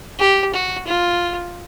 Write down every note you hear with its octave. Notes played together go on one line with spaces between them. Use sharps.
G4
F#4
F4